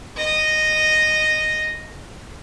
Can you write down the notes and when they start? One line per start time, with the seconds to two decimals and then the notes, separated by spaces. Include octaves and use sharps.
0.17 D#5